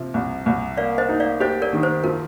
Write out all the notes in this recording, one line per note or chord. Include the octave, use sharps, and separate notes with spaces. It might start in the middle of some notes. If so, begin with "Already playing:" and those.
Already playing: C3 F3
C2
C2
A#3 D5 F5
C5 D#5
D#4
D5 F5
G4 C5 D#5
A#4 D5
D#3
C5
F3 A#4